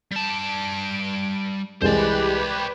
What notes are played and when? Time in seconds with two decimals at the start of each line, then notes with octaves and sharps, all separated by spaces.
0.12 G3 A5 D7
1.82 C2 E3 G#3 G4 B4 C5 D5